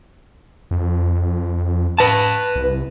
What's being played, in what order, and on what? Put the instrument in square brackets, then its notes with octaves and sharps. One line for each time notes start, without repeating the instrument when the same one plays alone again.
[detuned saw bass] F2
[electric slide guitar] B4 A5
[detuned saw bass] C2